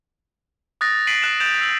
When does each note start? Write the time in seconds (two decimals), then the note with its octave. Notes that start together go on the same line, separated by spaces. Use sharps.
0.81 D#6 F#6 A6 A#6
1.07 B6 C7 D7 D#7 F#7
1.22 F#6 E7
1.40 G6 A6 D7 E7 F7
1.61 E6 F#7